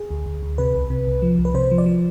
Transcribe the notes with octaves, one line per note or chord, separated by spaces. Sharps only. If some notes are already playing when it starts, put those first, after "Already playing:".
Already playing: G#4
D2
D2
D2
C3 B4
C2
C3
C2
F3
C2
B4
C3 C5
F3
D5
F3